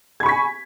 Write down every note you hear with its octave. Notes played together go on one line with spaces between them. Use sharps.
G#5 B5 C#6 G#6 B6